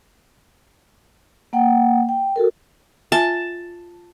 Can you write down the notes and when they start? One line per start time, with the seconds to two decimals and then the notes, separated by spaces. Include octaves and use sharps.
1.53 A#3 F#5 G5
2.09 G5
2.36 F#4 A4 A#4
3.12 F4 E5 G#5 A5